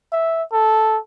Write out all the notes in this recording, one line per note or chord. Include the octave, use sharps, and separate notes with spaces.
E5
A4